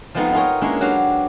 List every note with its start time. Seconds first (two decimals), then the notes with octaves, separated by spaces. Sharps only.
0.15 F3 G#3 A3 B3 C4 D#4
0.33 D#4 F4 G#4 A#4 C#5
0.61 G#3 A#3 C#4 D4 E4
0.81 F#3 D4 F#4 G4 B4 F5